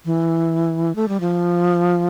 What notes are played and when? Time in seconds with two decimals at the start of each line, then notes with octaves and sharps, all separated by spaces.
0.05 E3
0.96 A3
1.08 G3
1.20 F3